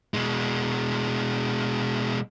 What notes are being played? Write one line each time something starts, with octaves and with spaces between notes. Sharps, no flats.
B2 G#3